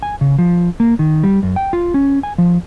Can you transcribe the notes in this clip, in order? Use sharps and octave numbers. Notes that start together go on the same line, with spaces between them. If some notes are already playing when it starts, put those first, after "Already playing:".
G#5
C#3
F3
A#3
D#3
G3
F#2
G5
F4
C#4
G#5
F3